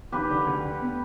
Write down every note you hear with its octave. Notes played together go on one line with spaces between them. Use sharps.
D#2 G4 B4
D3
D2
D3
B3